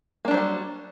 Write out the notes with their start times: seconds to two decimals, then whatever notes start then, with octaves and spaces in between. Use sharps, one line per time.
0.25 A#3
0.28 D4
0.31 F#3
0.34 C5
0.37 G3